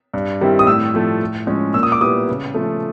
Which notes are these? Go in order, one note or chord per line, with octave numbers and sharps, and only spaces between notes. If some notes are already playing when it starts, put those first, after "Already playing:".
G2
D#3 G3 C4 E4
D#6
A2 E6
F3 A3
A2
F3 G#3 C#4
A#2 E6
D#6
D6
G3 B3 E4 D#6
C#3
F3 A3